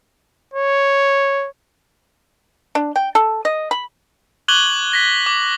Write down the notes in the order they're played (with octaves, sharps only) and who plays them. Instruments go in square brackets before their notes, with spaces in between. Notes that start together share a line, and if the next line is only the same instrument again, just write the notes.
[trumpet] C#5
[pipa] D4
G5
A4
D#5
B5
[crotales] C#6 D6 F#6 G#6 F#7 G7
G#6 A#6 B6
D6